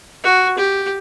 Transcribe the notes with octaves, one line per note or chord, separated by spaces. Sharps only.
F#4
G4